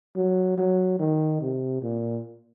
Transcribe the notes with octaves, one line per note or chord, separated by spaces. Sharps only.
F#3
F#3
D#3
C3
A#2